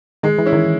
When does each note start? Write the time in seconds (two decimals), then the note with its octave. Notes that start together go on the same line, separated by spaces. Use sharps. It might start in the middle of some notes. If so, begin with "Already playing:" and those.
0.23 D#3 G#3
0.38 E3
0.46 C#4 E4
0.53 D#3